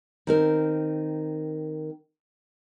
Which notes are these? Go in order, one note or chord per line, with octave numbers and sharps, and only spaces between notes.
D#3 C4 A#4